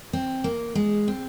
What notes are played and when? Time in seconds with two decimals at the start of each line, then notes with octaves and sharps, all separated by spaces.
0.13 C4
0.44 A#3
0.75 G#3
1.08 C4